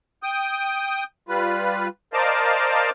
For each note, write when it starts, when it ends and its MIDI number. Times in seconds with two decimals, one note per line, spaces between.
0.23 1.04 79
0.23 1.04 87
1.29 1.88 55
1.29 1.88 65
1.29 1.88 71
2.13 2.90 70
2.13 2.90 72
2.13 2.90 74
2.13 2.90 75
2.13 2.90 77
2.13 2.90 81